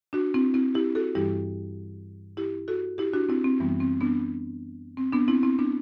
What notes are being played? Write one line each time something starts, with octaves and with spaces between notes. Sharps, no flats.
D4 F#4
C4 E4
C4 E4
E4 G4
F#4 A4
G2 E3 G3 E4 G4
E4 G4
F#4 A4
E4 G4
D4 F#4
C4 E4
C4
F#2 E3 G3 B3
C4
B3 D4
C4
B3 D4
C4 E4
C4 E4
B3 D4